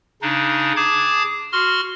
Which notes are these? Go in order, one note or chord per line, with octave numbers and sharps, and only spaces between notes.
C#3 D4 D#4
G#4 A5 D6 G#6
F#4 C6 F6